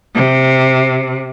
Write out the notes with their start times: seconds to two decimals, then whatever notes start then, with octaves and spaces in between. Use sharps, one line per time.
0.15 C3